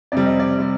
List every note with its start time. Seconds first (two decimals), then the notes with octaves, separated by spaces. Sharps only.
0.12 F2 C3 G3 D5
0.26 D#5
0.40 D5
0.58 C3 G3